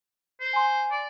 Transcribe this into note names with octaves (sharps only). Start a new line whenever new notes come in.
C5
G#5 C6
D5